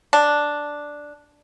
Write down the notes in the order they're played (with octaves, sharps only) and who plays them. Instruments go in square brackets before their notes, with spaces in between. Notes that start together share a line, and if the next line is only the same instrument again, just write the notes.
[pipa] D4